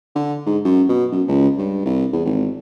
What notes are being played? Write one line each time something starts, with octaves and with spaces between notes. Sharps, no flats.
D3
G#2
F#2
B2
F#2
C#2
G2
C2
E2
G#1